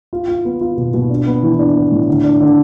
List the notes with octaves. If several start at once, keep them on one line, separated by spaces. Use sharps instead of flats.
F4
F4
B3
F4
B2
B2
D4
B3
E3
D4
B3
A2
D3
D4
D3